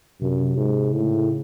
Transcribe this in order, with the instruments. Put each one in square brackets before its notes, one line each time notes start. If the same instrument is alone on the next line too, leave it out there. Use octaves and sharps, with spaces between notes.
[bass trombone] F#2 [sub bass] C3
[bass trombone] G#2
[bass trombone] A2 [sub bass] C#3